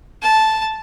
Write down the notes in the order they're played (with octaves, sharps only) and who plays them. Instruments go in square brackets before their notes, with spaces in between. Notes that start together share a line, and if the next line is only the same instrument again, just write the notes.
[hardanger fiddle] A5